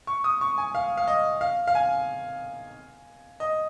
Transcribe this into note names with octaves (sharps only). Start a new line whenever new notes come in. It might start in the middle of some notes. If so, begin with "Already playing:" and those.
C#6
D#6
C#6
G#5
F5
F5
D#5
F5
F5
G#5
D#5